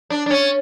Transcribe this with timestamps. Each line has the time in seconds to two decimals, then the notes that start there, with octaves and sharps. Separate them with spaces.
0.10 D4
0.26 D4
0.30 C#4